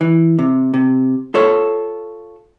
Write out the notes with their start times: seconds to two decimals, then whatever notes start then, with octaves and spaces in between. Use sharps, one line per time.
0.01 E3
0.39 C3
0.74 C3
1.34 F4 A4 C#5